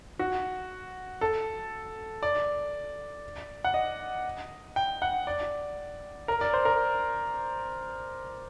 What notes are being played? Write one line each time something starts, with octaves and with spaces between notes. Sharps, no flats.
F#4
A4
D5
F#5
D#5
G5
F#5
D5
A#4
D5
C5
A#4